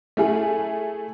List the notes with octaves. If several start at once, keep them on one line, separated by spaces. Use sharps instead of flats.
A3 E4 G#4